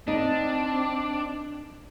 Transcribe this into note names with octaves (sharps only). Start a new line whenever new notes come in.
C4 D4 D#4